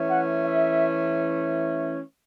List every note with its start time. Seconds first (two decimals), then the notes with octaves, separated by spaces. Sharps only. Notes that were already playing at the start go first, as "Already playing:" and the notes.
Already playing: E3 A3 C#4
0.10 F#5
0.45 E5